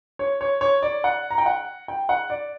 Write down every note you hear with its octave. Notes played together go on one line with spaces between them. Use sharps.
C#5
C#5
C#5
D5
F#5
A#5
G5
F#5
G5
F#5
D5